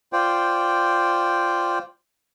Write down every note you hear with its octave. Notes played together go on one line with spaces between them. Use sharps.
F4 C5 D5 G5